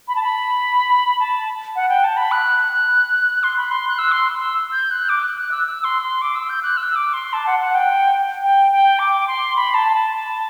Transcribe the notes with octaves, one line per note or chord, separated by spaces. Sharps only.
B5
A5
B5
A5
F#5
G5
A5
B5
F#6
F#6
C6
B5
C6
F#6
E6
C6
E6
G6
F#6
D6
F#6
F#6
E6
E6
C6
C6
D6
E6
G6
F#6
E6
D6
C6
A5
F#5
F#5
G5
G5
G5
D6
C6
B5
A5
A5